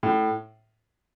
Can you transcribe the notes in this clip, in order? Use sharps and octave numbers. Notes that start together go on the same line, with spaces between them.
A2